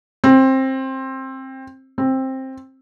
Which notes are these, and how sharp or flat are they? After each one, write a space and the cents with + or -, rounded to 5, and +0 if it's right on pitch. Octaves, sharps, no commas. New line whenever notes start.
C4 +20
C4 +15